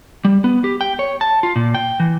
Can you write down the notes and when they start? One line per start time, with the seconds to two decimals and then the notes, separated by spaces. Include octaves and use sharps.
0.25 G3
0.44 B3
0.64 G4
0.81 G5
0.99 C#5
1.21 A5
1.43 F4
1.56 A#2
1.74 G5
2.00 E3